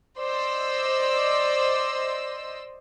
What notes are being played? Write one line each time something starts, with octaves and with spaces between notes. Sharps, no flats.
C5 D5 D#5 E6